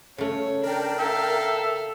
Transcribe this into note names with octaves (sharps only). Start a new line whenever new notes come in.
C#3 A3 C#5
D4 A#4 G5
A4 E5 F5